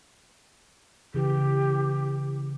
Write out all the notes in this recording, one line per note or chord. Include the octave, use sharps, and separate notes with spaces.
C#3 E3 G4